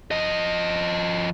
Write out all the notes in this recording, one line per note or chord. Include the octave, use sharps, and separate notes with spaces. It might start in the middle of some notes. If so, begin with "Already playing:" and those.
F3 D#5